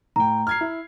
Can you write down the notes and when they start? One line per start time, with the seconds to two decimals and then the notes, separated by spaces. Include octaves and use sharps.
0.16 A2 G5 A#5
0.47 F6 G#6 C7
0.61 E4